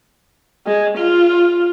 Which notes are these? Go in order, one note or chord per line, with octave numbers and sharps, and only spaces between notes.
G#3
F4